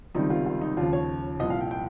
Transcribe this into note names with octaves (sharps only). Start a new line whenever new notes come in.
C#2 C3 D#3 G3 D#4
F4
F4
D#4
D#2 C#3 F3 F4
C#5
C2 A#2 F3 D#5
F5
G5
G5